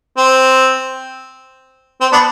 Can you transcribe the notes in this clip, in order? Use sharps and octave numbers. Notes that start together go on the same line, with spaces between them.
C4
C4
B3 D4